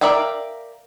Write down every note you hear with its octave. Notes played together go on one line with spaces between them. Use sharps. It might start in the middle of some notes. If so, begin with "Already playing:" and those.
A#4 D5 E5 F5 G5